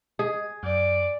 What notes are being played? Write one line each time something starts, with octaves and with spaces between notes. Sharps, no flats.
G#4 D#5
F#2 D5